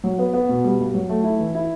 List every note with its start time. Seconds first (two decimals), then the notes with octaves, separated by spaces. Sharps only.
0.04 F#3
0.18 B3
0.33 B3
0.49 B2
0.64 G3
0.79 G2
0.94 F#3
1.09 A3
1.24 E4
1.39 E3
1.55 E4